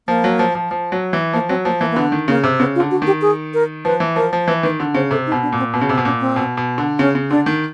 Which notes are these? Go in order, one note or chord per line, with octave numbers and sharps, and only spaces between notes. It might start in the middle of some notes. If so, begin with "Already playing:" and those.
F3 A#3
F#3
F3
F3
F3
F#3
E3
F3 A#3
F#3 C4
F3 A#3
E3 A#3
A#3
D3 B3
D#3
C#3 A#3
C3
C#3 B3
F4
D3
F#4
D#3 G4
G#4
A#4
F3 B4
E3
F3 A#4
F3
E3 B4
D#3 B4
D3
C#3 C5
C3 A4
D#4
B2
D4
A#2
C4
B2 B3
C#3
C3 C4
B2
A#2 C#4
C4
B2
B2
D3
C#3 C#4
C#3
D3 D4
D#3